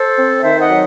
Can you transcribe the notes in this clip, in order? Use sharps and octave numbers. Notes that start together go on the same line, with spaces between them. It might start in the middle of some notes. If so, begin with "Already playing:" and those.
Already playing: A4 C5
C4
D#3 C5 E5
D#5 F#5
F#3